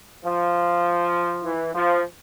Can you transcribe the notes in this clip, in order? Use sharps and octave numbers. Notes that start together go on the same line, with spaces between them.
F3
E3
F3